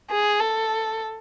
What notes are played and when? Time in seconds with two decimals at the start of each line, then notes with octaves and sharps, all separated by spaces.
0.11 G#4
0.40 A4